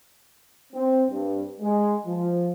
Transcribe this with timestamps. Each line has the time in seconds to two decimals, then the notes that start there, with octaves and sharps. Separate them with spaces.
0.73 C4
1.10 G2
1.61 G#3
2.06 F3